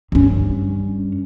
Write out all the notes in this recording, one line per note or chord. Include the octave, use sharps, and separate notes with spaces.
G2 C#4